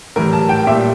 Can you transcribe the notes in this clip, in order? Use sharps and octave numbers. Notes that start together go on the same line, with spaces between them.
A2 E3 G3 A#4
A5
G5
A#2 G3 E5